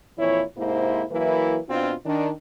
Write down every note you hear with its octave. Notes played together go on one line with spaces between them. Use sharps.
F2 A#2 E3 E4 C#5
G#2 C3 A#3 E4 C5
E3 F#3 A#3 E4 A#4 B4
B2 C4 D4 F4
D#3 D4